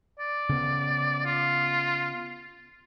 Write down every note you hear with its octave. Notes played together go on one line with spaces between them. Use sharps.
D5
C#3 B3
F4